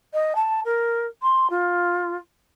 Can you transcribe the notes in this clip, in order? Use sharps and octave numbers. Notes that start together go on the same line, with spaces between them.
D#5
A5
A#4
C6
F4